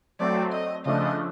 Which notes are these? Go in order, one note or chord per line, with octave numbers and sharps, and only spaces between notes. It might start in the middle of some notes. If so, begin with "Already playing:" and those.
F#3 A3 C4 D5
D#5
C#3 F3 A3 D4 D#5